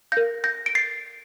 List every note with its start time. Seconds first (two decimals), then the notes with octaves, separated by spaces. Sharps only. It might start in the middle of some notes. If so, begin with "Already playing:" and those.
0.12 A#4 F5 G6 A#6
0.44 G6 A#6
0.66 D7
0.75 A6 C7